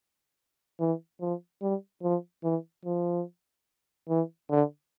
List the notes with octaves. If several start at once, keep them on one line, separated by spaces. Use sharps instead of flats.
E3
F3
G3
F3
E3
F3
E3
D3